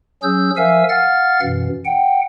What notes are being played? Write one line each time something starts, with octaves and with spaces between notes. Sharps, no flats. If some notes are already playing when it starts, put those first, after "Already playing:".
F#3 C#4 G#4 E6 G6
F3 A#4 E5 F5 G#5 E6
F5 F#5 F6 A6
F#2 B2 E3
F#5 G5